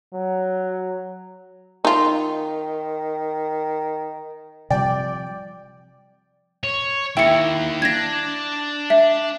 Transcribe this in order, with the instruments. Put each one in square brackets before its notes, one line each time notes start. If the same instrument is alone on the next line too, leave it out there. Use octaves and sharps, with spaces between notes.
[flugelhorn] F#3
[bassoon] D#3 [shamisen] D#4 F4
[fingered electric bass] C3 F3 G3 [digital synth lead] D5 [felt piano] G5
[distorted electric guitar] C#5
[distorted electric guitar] D#2 [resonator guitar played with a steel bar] E4 [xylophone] G5 C#7
[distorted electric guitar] D4 [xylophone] G#6 A#6
[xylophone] E5